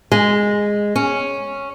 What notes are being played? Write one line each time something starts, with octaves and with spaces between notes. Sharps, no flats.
G#3
C#4